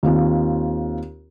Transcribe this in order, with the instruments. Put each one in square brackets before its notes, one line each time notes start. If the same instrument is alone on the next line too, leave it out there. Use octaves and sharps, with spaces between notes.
[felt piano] D#2 C4 F4